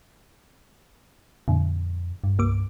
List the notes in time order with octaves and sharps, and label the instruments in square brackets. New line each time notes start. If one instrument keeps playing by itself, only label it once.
[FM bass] F2 [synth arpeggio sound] A#2 D3
[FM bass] G2
[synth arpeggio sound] C2 A#3 D6